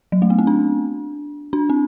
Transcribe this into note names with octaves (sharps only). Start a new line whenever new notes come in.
F#3
A3
B3
C4
D4
D4
C4